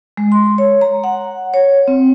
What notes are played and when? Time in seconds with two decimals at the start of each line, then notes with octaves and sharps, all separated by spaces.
0.17 G#3
0.32 C6
0.58 C#5
0.81 A#5
1.04 F#5
1.54 C#5
1.88 C4